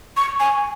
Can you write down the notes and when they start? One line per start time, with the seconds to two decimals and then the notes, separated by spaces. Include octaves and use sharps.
0.17 C#6
0.40 G#5